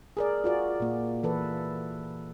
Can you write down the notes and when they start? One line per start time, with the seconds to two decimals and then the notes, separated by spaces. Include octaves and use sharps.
0.17 G#4 A#4 D5
0.44 F4 F#4 D5
0.80 A#2 A#3
1.23 E3 A4 B4